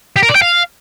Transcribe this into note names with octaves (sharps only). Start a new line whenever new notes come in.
G4
A#4
D5
G5
F5